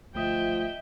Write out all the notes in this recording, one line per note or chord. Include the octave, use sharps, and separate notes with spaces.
G1 F3 A3 D#5 E5 G5 D#6